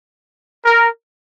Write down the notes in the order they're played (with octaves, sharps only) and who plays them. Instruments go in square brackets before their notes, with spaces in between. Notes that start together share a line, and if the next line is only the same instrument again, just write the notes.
[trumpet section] A#4